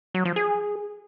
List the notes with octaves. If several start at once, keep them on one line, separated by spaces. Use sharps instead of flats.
F#3
F3
G#4